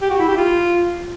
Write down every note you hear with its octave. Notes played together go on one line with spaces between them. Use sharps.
G4
F#4
E4
G4
F4